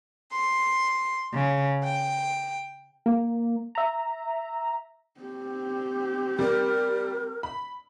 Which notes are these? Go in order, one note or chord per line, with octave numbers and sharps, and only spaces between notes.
C6
C#3
G5
A#3
E5 A#5
C4 G4
G3 A#4
B5